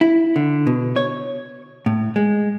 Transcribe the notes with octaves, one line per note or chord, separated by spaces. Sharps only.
E4
D3
B2
C#5
A2
G#3